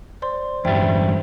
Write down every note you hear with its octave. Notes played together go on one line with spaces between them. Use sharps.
C5 D5 C6
E2 G2 G3 C5 E5 G5